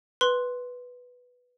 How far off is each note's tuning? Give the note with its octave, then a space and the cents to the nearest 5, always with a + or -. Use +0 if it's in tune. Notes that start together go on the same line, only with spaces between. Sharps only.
B4 +0 C6 +0